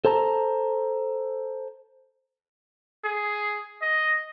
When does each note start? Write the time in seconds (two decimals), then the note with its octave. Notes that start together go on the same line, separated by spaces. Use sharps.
0.05 A4 C5 A5 A#5
3.05 G#4
3.82 D#5